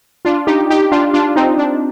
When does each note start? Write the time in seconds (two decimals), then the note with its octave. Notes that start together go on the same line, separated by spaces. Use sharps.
0.25 D4 F4
0.47 D#4 G4
0.70 D#4 G4
0.92 D4 F4
1.14 D4 F4
1.36 C4 D#4
1.58 D4